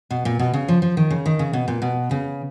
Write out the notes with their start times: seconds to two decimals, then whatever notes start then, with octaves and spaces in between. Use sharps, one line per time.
0.11 B2
0.25 A#2
0.39 B2
0.54 C#3
0.68 F3
0.82 F3
0.97 D#3
1.11 C#3
1.26 D#3
1.39 C#3
1.53 B2
1.68 A#2
1.82 B2
2.11 C#3